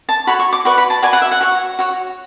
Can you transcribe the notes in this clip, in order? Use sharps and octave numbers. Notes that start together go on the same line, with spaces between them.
A5
F#4 A4 C#5 B5
C#6
D6
F#4 B4 D5 C#6
B5
A5
F#4 B4 D5 G#5
F#5
E5
F#5
F#4 C#5
F#4 C#5